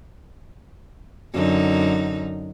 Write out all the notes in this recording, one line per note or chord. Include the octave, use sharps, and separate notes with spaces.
F#2 D3 D#4